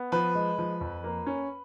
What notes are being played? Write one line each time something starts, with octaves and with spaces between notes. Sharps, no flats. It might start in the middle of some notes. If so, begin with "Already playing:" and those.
Already playing: B3
F3 B4
G#3
F3
F2
A#3
C#4